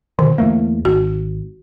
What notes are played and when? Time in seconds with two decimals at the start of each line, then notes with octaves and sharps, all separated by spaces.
0.19 B2 D3 D#3
0.38 E2 A3 A#3
0.85 G#1 F#4